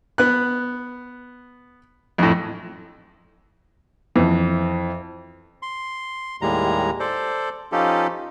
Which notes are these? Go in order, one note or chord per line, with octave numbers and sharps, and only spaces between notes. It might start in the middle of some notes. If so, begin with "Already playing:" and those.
B3 F#6
F2 A2
F2 E3
C6
D#2 A2 G3 G#3 A#5
A4 C5 D5
F3 C#4 D#4 F4 G4 A4